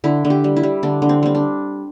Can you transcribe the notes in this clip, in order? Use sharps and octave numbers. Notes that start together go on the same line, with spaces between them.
D3 E4
D3
G4
G3
E4
G3
D3 D4
D3
C4
G3 C4
D4